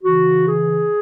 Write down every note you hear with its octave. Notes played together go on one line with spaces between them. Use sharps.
C#3 E3 F#4
G#4